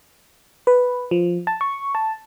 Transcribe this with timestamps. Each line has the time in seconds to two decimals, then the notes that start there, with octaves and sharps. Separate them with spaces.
0.67 B4
1.11 F3
1.47 A5
1.61 C#6
1.95 A5